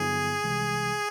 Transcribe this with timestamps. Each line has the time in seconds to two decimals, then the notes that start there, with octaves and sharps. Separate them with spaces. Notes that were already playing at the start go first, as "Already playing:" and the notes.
Already playing: G2 D3 F#3 B3 E4 G#4
0.44 C2 C3 E3 G#3